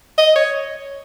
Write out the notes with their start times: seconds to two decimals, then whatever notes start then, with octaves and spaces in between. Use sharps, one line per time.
0.18 D#5
0.36 C#5